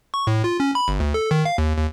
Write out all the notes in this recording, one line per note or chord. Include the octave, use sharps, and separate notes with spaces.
C#6
A2
F4
C#4
B5
G1
D2
A4
D#3
F5
D#2
D#2